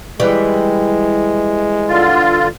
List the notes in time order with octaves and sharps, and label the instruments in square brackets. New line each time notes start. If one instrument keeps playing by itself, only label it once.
[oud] E3 G3 [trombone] G#3
[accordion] D3 F4